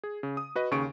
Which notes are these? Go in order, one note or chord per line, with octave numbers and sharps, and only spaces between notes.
G#4
C#3
D#6
F#4 B4 D#5
D#2 C#3 C#6 D7